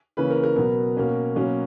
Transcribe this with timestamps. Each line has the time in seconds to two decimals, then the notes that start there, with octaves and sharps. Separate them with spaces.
0.17 C#3 E3 A#3 C#4 B4
0.30 A#4
0.43 A#4
0.56 B2 F#3 B3 A#4
0.96 B2 A#3 C#4
1.36 B2 F#3 A#3 C#4